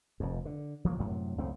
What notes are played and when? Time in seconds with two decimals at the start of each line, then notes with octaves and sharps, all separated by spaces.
0.20 F1 F2
0.45 D3
0.85 F3 F#3 A#3
0.99 F#2 A2 C3 F#3
1.38 C#2 F#2 A3 C4